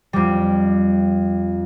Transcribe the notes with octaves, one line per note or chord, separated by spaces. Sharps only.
F2 G3